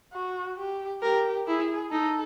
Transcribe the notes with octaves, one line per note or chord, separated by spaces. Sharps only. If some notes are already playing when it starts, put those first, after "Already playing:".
F#4
G4
G4 A#4
E4 G#4
D#4 A4